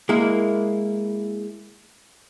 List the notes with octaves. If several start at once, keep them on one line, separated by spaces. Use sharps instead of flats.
G#3 A#3 E4 A#4